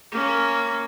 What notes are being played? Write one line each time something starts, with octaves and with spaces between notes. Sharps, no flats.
A#3 C#4